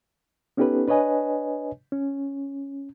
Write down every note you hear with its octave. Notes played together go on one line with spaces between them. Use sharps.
B3 C#4 D#4 G4 A4 B4
D4 B4 C#5 D#5 G#5
C#4